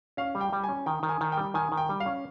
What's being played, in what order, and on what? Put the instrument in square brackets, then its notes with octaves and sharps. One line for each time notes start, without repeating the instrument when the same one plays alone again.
[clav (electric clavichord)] C#4 [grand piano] F5
[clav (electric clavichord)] G3
[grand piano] G5
[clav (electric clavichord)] G3 [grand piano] G5
[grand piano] G#5
[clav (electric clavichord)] C#4
[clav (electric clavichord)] D#3 [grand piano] G5
[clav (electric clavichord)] D#3
[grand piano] G#5
[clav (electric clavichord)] D#3
[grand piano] G5
[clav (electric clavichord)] G3
[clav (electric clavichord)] D#3 [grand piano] G#5
[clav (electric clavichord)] D#3
[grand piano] G5
[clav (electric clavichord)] G3
[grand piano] F5
[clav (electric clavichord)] C#4